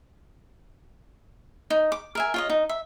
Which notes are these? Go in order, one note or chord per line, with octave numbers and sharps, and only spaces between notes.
D#4
D6
A#4 E5 G#5
F4 C#5 D#5
D#4
E5